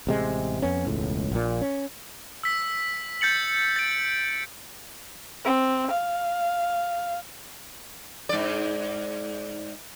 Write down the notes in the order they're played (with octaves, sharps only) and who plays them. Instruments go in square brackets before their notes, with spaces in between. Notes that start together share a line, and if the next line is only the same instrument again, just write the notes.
[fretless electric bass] A1 C3 G#3
F2 B3 C#4
E1 C#2 A2
A#1 A#2
C#4
[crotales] E6 B6
G6 A6 C#7 F#7
A6 D7
[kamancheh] C4
F5
[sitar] G#2 D5